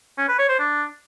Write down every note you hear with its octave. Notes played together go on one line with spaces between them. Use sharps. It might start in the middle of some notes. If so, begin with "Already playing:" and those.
C#4
B4
C#5
C5
D4